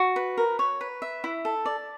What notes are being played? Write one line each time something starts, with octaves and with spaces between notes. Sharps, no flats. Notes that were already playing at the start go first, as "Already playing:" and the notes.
Already playing: F#4
B4
A#4
C#5
B4
E5
E4
A4
D5